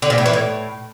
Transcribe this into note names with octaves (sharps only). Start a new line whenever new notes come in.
D3
A#2
A2
E3
A2